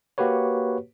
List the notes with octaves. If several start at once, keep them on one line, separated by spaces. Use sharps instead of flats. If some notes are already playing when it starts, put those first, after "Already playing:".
A#3 F#4 G4 B4 C#5